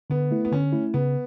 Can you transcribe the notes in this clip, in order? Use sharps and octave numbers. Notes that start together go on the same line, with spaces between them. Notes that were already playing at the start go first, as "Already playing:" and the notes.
D3 B3
A3 E4
B3
D3 C#4
A3 E4
C#3 B3